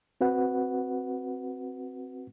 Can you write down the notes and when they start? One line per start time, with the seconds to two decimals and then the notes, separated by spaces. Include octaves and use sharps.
0.21 C4 F#4 B4 F#5